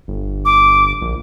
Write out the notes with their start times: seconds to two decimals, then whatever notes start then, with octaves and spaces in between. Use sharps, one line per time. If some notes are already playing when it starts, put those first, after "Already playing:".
0.08 G1
0.45 D6
1.02 A#1